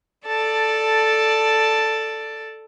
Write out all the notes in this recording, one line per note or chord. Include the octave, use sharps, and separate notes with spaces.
A4 D5 A5